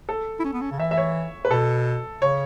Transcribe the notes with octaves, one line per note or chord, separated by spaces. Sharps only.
A4
E4
C#4
B3
C#4
C#3
E3 E5
E5
C#5
B4
B2 A4
C#3 C#5